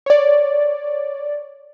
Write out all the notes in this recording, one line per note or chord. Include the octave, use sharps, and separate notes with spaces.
C#5 D5